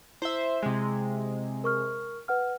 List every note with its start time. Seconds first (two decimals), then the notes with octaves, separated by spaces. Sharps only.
0.22 E4 C5 E5 G7
0.63 C3 G#3
1.64 A#4 C#6 F6
2.28 B4 F#5 F6